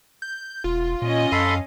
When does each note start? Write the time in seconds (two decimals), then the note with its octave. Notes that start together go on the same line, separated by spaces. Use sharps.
0.22 G6
0.64 E1 F4
1.02 A#2 C#4 D#5
1.32 F#2 A4 F5 B5 C6